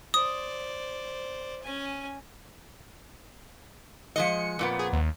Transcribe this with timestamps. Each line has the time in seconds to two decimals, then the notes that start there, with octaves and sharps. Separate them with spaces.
0.14 C5 D5 D#6
1.62 C#4 G#5
4.16 F3 G#3 D#5 C#7
4.59 F2 A#2 B3
4.79 G#4
4.93 D#2